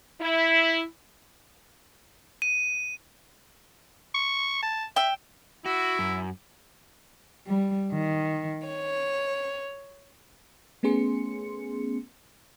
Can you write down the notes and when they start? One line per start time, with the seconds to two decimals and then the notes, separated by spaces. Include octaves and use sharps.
0.21 E4
2.42 D#7
4.15 C#6
4.63 A5
4.96 E5 G5 E6
5.66 E4 F#4
5.99 F#2
7.47 G3
7.92 D#3
8.68 C#5
10.83 A3 B3 C#4 G#4 C6 C#7